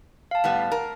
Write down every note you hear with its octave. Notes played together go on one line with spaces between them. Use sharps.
F5 A5
A2 G3 B3
A#4